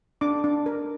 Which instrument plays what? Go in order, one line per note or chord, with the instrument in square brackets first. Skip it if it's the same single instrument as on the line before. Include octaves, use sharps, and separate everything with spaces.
[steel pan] D4 D6
D4
A#4